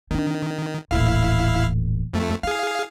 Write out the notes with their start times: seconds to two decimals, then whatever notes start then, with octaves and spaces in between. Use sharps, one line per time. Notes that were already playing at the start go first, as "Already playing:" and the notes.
0.11 D#3 C4 D4
0.91 D#1 A1 E4 F5
2.14 F2 A3
2.43 E4 G#4 F5